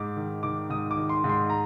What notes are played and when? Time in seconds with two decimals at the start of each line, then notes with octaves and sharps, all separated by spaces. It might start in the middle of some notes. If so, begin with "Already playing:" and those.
Already playing: G#2 D6
0.16 D#3
0.43 D#3 D6
0.70 G#2 D#6
0.91 D6
0.97 D#3
1.09 C6
1.24 G#2
1.29 C6
1.50 A#5